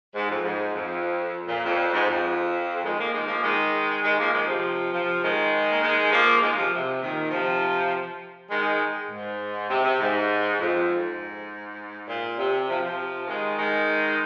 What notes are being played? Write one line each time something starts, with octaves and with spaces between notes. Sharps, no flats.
G#2
F2
G#2
F2
A#2
F2
G#2
F2
D#3 G#3
F3 A#3
D#3 G#3
F3 A#3
D#3 G#3
D#3 G#3
F3 A#3
D#3 G#3
C3 F3
C3 F3
D#3 G#3
A#3
D#3 G#3
F3 A#3
F3
D#3 G#3
C3 F3
C3
A#2 D#3
C3 F3
D#3 G#3
G#2
C3
C3
G#2
F2
G#2
A#2
C3
C3 F3
C3 F3
D#3 G#3
D#3 G#3